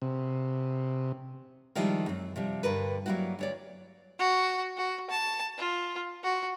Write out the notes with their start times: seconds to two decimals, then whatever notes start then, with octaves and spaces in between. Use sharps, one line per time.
0.02 C3
1.75 D#3 F3 G3 G#3 E4
2.06 F#2 C4
2.36 C3 F3 G3
2.63 G2 D3 A#4 B4
3.06 F#3 G3 A#3 E4 F#4
3.39 D2 C#5 D5
4.19 F#4
4.77 F#4
5.10 A5
5.58 F4
6.23 F#4